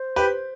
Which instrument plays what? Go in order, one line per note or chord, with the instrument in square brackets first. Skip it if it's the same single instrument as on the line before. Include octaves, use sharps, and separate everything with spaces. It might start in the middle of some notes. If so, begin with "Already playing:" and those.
Already playing: [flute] C5
[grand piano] G4 B4